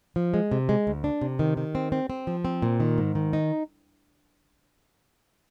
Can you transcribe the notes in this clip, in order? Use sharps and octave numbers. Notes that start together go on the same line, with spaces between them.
F3
G#3
C3
G#3
D2
D4
C3
D#3
D#3
C4
C4
C4
F3
C4
A#2
D#3
G#2
D#3
D#4